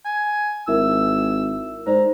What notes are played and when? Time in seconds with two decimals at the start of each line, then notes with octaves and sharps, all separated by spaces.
0.05 G#5
0.67 G#1 E4 A#4 E5 E6
1.87 G#2 C5 D5 A#5